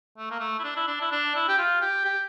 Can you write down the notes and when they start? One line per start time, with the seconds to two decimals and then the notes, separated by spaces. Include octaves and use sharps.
0.17 A3
0.30 A#3
0.40 A3
0.59 E4
0.64 D4
0.76 E4
0.87 D4
1.01 E4
1.11 D4
1.35 E4
1.48 G4
1.58 F4
1.81 G4
2.05 G4